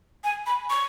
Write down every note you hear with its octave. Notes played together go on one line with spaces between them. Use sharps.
G#5
B5
C#6